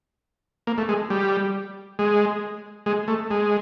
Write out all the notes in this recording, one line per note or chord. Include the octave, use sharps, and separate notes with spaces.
A#3
A3
G#3
G3
G#3
G#3
A3
G#3